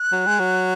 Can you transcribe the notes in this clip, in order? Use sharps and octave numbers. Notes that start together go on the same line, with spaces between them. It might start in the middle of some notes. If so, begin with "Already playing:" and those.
Already playing: F#6
F#3
G#3
F#3